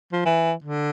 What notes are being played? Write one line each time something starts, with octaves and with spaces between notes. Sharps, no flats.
F3
E3
D3